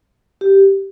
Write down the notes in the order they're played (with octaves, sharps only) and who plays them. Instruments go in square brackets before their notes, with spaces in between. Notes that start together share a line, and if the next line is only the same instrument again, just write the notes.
[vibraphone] G4